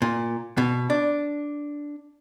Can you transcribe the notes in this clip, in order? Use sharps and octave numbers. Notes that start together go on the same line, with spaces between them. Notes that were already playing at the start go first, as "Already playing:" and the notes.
A#2
B2
D4